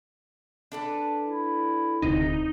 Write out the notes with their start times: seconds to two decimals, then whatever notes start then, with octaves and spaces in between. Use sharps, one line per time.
0.72 D4 A4 B4
1.26 E4
2.02 D1 D2 C3 D#4